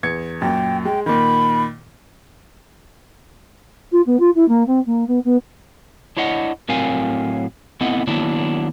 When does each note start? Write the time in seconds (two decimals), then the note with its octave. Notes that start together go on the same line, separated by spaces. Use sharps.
0.03 E2 G#6 C#7
0.42 F#2 A#2 G5
0.85 G#3 G5
1.06 A#2 D#3 B5
3.92 F4
4.06 B3
4.19 F4
4.35 E4
4.48 A#3
4.67 C4
4.86 A#3
5.07 B3
5.25 B3
6.17 D4 E4 C#5 D#5 F#5
6.69 A2 F#3 C4 A#4 F5 G#5
7.81 A3 B3 C4 E4 D#5 F#5
8.07 D#3 F#3 A#3 B3 D4 E4